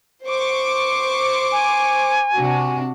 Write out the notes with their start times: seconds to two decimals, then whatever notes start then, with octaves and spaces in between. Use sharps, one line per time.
0.27 C5 C#6 D6
1.52 G#5
2.34 C3 D4 F#4